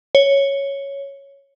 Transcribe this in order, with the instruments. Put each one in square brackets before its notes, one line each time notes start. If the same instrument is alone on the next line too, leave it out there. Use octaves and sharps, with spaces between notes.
[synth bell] C#5